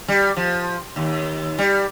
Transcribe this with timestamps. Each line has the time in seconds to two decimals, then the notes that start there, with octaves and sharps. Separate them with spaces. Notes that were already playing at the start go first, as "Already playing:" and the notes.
0.08 G3
0.37 F3
0.96 D#2
1.59 G3